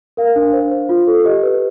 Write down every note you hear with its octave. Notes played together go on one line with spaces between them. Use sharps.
A#4 F5
D4
C5
C5
F4
A4
G4 D#5
B4